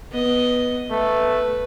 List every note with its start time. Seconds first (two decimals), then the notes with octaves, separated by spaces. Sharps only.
0.11 B3 D#5
0.91 A3 B4